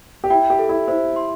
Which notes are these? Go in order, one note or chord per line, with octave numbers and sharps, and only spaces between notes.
G4
E4 G5
G4
A4
E4
E4 C5
C6